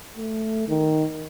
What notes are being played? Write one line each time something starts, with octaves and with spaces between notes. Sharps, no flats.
A3
D#3